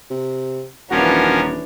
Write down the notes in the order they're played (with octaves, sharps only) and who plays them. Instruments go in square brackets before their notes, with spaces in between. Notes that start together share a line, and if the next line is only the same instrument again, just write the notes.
[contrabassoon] C3
[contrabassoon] D#1 [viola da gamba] E3 D4 C#5 [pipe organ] F3 C#4 A#4 [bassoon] F#4